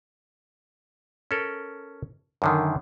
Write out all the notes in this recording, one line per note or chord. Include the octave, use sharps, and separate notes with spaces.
C#4 A4 A#4
F#2 D3 D#3